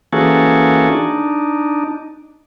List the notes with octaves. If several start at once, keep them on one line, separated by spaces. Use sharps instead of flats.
E3 A#3 C#4 F#4 G#4 A4
D4 D#4